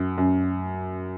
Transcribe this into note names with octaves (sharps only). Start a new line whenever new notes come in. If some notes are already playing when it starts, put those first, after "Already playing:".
Already playing: F#2
F#2